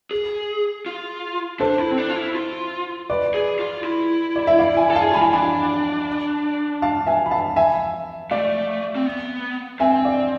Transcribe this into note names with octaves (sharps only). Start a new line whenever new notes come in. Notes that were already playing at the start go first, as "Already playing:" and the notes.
G#4
F4
D4 A4 C5
E4
C4
D4
F4
E4
F4
B4 D5
G#4
F4
E4
D5
E5
D5 F5
E5 G#5
A4
G#4 F5 A5
F4 G#5 B5
E4
D4 G#5 B5
F5 A5
E5 G#5
B5
F5 A5
E5 G#5
A3 D5 F5
C4
B3
C4 E5 G#5
D5 F5